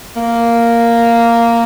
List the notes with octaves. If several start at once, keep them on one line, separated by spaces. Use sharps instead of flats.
A#3